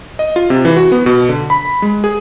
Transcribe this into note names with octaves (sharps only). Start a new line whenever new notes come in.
D#5
F4
C3
E3
F#4
B3
B2
D3
B5
G#3
G#4